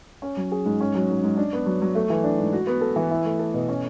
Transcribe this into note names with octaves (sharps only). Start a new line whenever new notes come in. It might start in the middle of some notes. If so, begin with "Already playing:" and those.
C#4
F#3
G#4
G#2
C#4
F#3
G#2
G#2
D4
B3
F#3
F#3
A3
E3
D4
G#2
F#4
B3
A4
E3
E4
A3
A4
B2
C#4